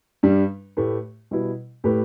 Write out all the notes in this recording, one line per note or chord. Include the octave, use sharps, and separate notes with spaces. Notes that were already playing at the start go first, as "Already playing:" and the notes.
G2 G3 D4
A2 A3 G4 B4
B2 G3 E4 B4
A2 A3 G4 B4